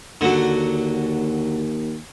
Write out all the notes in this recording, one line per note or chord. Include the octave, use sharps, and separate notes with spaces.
D#2 D3 F#3